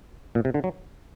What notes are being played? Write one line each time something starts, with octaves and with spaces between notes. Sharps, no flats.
A#2
C3
D3
F#3